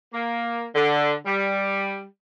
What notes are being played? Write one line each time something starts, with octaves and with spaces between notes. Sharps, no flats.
A#3
D3
G3